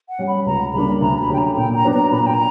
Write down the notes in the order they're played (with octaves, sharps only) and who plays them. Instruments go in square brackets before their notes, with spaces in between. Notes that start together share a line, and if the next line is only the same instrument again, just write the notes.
[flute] F#5
[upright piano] G3 C#4
[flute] B5
[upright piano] C#2 [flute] A#5
[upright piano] C#3 G3 A#3 D4 [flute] B5
[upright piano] D2 [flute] A#5
[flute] B5
[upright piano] D3 F#3 C#4 G4 [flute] G5
[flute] A#5
[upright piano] A#2 [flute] G5
[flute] A#5
[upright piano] F#3 B3 D4
[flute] A#5
[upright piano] A#2 [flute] B5
[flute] A#5
G5
A#5